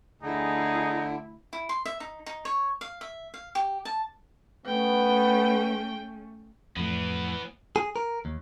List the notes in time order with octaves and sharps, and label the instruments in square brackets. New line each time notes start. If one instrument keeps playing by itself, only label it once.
[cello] D2 E4 [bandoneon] D3 [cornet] D#4 [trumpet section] G#4
[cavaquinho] E4
C6
E5
D#4
D#4
C#5
F5
E5
F5
G4
A5
[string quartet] A3 C#4 [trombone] B3 [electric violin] G5
[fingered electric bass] F2 A2 [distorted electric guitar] E3 B3
[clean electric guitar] G#4
A#4
D#2